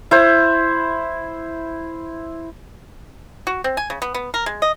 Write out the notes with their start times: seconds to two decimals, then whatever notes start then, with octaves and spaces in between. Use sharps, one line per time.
0.11 E4 C5
3.47 F#4
3.64 C4
3.77 G#5
3.90 C#3
4.02 B3
4.14 B3
4.34 A#4
4.46 G#3
4.62 D#5